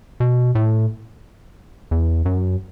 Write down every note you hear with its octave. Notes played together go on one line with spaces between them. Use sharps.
B2
A2
E2
F#2